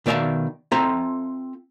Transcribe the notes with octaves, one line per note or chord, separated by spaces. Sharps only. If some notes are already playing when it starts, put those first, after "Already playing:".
B2 D#3 D5 E5 F5 A5
C4 F4 A4 E5 A#5